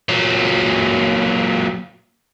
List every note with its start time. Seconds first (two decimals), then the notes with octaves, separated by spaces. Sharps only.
0.09 A#2 F#3